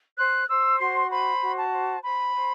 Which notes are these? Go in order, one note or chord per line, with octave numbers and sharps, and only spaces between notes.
C5 F#6
C5 E6
F#4 C6
C5 B5
F#4
A5
C5
C5 B5
C5